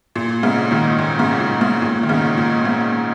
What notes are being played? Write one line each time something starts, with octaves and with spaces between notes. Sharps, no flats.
A#2
G#2 C#3
A#2 D#3
A#2
G#2 C#3
A#2
G#2
A#2
D#3
G#2 C#3
A#2
G#2